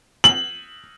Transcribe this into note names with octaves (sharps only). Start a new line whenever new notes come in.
F#7